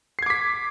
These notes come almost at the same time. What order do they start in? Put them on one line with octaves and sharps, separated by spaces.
C7 G#6 D6 B6